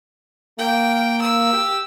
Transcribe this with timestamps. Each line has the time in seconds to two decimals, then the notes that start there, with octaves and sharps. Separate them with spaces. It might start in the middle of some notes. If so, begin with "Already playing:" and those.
0.58 A#3 G5
1.22 E6
1.53 G4